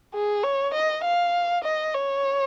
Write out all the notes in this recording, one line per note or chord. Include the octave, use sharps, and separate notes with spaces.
G#4
C#5
D#5
F5
D#5
C#5